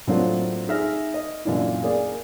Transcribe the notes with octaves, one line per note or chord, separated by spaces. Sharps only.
A2 F#3 A#3 C4 D4 F4
D#4 G#4 E5 F6 A#6
D#5
F#2 A#2 E3 D4 E4
A#3 G#4 D5